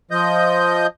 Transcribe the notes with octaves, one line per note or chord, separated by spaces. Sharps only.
F3 D#5 G6